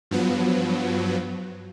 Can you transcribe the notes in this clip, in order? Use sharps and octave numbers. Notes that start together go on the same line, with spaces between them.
G2 F3 F#3 B3